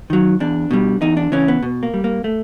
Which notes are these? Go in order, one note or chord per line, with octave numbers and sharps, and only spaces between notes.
D#3 F#3
E2 D4
B2 G3
E2 D#4
D4
C#3 E3 C#4
B3
B2
A#3
G3
A#3
A3